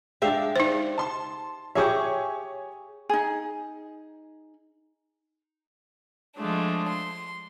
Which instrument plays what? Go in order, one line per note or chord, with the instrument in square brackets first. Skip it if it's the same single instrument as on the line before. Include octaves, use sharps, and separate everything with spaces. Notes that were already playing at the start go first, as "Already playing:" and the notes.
[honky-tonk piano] G#3 D4 [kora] G4 E5 F5
[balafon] D#4 C5
[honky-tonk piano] A5 C6
[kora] G4 G#4 E5 [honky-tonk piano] C#5 G#5 C#6
[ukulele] D#4 G#4
[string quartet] F3 G#3 A3 D4
C6